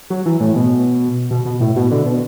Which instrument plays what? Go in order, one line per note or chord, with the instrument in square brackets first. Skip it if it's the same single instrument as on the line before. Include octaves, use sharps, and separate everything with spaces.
[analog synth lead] F#3
E3
A2
B2
B2
B2
A2
B2
D3
B2